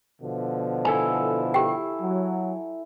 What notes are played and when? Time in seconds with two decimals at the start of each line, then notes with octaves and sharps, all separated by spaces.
0.22 B2 D3 F3
0.85 E4 A4 G#5
1.54 G4 G5
2.02 F#3